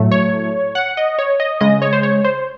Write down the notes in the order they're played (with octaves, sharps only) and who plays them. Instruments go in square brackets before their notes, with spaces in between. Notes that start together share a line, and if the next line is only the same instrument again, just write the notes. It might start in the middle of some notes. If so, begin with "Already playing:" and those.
Already playing: [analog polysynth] A2 F#3 A3
C#5
F#5
D#5
C#5
D#5
C#3 G#3 D#5
C#5
C5
C#5
C5